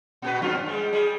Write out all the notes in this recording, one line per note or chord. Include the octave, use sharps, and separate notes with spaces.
A#2 F#4 B4
F#2 C4 F4
G3 G#3
G3 G#4